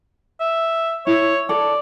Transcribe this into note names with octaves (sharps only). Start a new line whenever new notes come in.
E5
E4 C#5
A4 D5